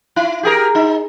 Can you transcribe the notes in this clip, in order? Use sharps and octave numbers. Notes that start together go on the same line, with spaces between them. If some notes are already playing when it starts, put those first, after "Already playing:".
E4
G4 G#4 A#4
D#4